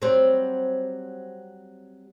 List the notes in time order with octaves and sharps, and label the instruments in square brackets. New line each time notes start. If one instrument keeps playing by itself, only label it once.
[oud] F#3 G3 C4